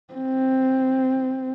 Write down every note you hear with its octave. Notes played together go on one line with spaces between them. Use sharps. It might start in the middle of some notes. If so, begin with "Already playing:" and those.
C4